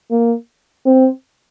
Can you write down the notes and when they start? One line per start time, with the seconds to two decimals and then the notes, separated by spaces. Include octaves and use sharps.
0.11 A#3
0.86 C4